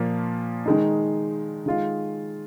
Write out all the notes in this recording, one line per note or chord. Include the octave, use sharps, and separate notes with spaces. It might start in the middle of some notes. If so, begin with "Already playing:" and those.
Already playing: A#2 F3 A#3 F4
D#3 G#3 D#4
D#3 G#3 F4